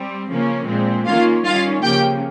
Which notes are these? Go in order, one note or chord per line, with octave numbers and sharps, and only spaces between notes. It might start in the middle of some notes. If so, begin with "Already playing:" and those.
Already playing: G3 C4
C#3 F3 A#3 C#4
A#2 G#3 C4
D#3 A#3 C#4 F4 F5
D#3 G3 C#4 F4 F5
C#3 F3 A#3 G4 G5